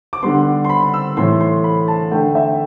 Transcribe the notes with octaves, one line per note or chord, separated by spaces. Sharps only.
D6
D3 G3 B3 C6
C6
B5
E6
A2 E3 A3 C6
C6
B5
A5
D3 A3 G5
E5